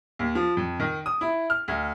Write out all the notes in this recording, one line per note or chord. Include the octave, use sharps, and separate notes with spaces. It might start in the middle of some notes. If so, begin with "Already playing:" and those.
D#2
F3
F2
D#3
D#6
E4
F6
D2